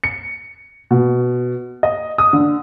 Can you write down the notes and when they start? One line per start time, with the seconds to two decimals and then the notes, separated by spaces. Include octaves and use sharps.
0.04 C#7
0.91 B2
1.83 D#5
2.18 D#6
2.33 D3